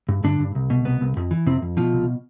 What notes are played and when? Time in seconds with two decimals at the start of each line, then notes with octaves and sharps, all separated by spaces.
0.09 G2
0.24 G2 D3 D4
0.40 G2
0.55 C2
0.70 B2
0.85 C2 B3
1.01 C2
1.17 F2
1.31 E3
1.46 F2 C3 C4
1.62 F2
1.77 B2 F3 F4
1.93 C2